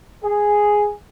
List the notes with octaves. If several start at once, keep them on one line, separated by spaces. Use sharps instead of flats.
G#4